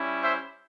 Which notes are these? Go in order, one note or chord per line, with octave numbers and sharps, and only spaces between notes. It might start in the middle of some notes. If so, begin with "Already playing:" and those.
Already playing: G3 C#4 E4
C5 E5